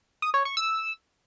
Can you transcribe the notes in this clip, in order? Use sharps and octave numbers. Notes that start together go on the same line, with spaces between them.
D#6
C#5
C#6
E6